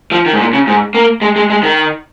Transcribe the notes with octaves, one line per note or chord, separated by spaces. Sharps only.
F3
D#3
G#2
A#2
C#3
G#2
A#3
G#3
G#3
G#3
D#3